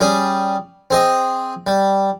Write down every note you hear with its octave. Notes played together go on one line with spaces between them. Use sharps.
G3 C#4 G#4
C4 G#4 D#5
G3